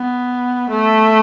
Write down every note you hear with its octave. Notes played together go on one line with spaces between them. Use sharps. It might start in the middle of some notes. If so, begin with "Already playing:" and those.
Already playing: B3
A3